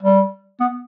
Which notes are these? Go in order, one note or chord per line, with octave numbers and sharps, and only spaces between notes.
G3
B3